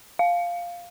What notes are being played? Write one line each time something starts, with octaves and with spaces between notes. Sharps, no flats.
F5